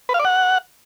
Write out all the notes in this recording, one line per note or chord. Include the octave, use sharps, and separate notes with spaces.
B4
F5
D5
F#5